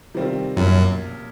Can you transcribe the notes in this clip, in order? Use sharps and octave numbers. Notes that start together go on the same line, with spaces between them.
C3 D#3 G3 C4 F4
B1 F#2 A#2 F3